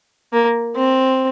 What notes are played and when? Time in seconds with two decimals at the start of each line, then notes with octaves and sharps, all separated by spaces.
0.33 A#3
0.76 C4